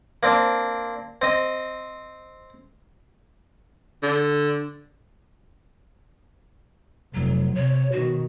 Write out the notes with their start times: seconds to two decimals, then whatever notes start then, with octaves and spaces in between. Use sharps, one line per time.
0.23 A#3 C4 D4
1.22 C4 D#5
4.03 D3
7.15 F1 F#3
7.55 C3 C#5
7.92 B2 D#3 F#4